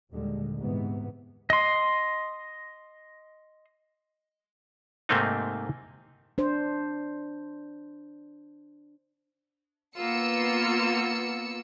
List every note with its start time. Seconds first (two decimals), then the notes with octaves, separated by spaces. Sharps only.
0.12 D#2 A#2 D3 G3 G#3
0.58 G#2 C3 E3 B3
1.50 D#5 C6
5.09 G#2 C3 A3 A#3 C4 D#4
6.38 D4 C5
9.96 A#3 B3 F4 E6 C#7